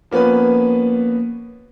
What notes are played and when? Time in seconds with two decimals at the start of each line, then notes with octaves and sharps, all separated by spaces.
0.11 F3 A#3 B3 C#4 B4